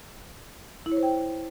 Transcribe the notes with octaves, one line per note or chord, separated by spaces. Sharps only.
E4
C#5
C5
G5